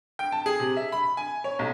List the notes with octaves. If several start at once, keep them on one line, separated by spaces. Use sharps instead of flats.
G5
A5
G#4
C3
E5
B5
G#5
C#5
B1